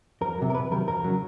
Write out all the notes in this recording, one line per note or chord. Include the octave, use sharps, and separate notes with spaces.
F2 A#4
C3 D#3 F#3
A#4
F2 B4
C3 D#3 F#3 A#4
F2 A#4
C#3 F#3